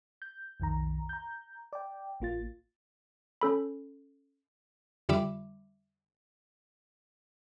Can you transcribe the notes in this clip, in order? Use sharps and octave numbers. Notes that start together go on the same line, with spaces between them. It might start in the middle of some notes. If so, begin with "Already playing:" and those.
G6
B1 F2 D#3 A#5
A#5 G6
D5 G5
A1 A#3 F4 A6
C#4 A4 B5
F2 D3 G3 E5 B5 D6